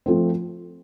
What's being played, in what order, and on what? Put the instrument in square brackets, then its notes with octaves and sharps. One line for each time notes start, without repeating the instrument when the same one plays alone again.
[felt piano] F3 A3 C4